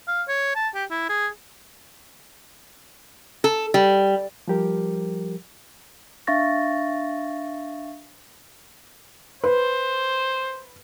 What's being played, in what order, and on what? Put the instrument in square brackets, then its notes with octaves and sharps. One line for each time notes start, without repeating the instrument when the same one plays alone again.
[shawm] F5
C#5
A5
G4
E4
G#4
[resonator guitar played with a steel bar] A4
G3
[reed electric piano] F3 G3 G4 A#4
[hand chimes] D4 E5 F5 C#6 A6 A#6
[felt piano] B4 [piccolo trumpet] C5